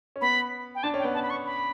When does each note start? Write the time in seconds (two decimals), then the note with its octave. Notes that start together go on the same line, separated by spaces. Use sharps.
0.16 C#4
0.21 B3 B5
0.75 G5
0.83 D4 A5
0.94 C#4
0.99 G5
1.04 B3
1.14 C#4 A5
1.23 B5
1.30 C#6
1.46 B5